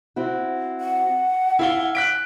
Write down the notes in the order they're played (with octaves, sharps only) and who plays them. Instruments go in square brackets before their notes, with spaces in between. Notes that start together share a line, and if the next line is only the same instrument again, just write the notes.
[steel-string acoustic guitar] C4 E4 F#4
[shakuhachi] F#5
[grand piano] E4 F5 G7 [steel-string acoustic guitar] G#5
[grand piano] F#6 B6 D7